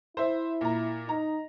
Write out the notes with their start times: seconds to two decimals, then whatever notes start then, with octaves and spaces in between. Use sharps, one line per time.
0.17 E4 C5 E5
0.61 A#2 A#5
1.09 D#4 A#5